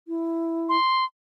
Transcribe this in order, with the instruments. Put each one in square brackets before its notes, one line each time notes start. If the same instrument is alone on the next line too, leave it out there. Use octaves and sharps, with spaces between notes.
[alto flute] E4
[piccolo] C6